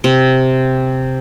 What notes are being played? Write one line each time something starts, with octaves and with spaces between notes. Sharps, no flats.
C3